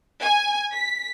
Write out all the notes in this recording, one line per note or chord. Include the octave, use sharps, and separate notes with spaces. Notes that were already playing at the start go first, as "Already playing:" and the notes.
G#5
B6